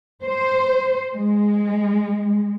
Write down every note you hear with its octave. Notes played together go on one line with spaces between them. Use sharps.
C5
G#3